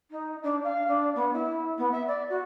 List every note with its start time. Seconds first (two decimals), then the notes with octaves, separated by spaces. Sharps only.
0.11 D#4
0.43 D4
0.64 F5
0.88 D4
1.15 B3
1.33 E4
1.78 B3
1.92 E5
2.08 D5
2.30 F#4